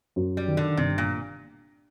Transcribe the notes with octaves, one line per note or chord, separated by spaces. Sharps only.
F#2
G3
D#3
D3
G1 C3
A#2